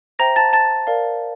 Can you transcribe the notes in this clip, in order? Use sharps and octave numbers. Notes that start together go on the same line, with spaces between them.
C5 E5 G5 A#5 A#6
A5 A6
A5 A6
A#4 D5 F5